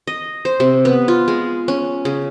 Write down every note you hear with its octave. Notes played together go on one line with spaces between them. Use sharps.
D#5
C5
C3
B3
F4
G#3
C#4
C#3